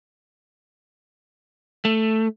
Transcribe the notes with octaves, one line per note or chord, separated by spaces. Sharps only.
A3